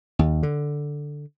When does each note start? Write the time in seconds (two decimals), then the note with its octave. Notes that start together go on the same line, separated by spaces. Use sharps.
0.19 D#2
0.43 D3